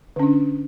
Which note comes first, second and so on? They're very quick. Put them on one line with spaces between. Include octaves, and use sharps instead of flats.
D3 C#4 D4